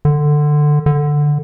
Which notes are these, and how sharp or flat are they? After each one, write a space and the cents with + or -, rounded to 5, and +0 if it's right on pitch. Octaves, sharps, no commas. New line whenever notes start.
D3 +15
D3 +5